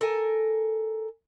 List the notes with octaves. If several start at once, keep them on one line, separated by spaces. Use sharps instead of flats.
A4 A#4 G#5